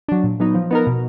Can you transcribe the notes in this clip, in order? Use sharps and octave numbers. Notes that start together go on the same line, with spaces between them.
F#3 D4
A#2
F#3 B3 D#4
F3
B3 D#4 A#4
B2